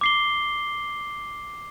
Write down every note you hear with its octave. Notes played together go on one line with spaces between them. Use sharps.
D6 C7 G7